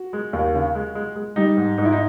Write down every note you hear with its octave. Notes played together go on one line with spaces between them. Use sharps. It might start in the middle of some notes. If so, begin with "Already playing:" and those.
Already playing: F#4
G#3
D#2
C#3
G#3
G#3
G#3
G3 D#4
G#2
G#2 D#4
E4
D#4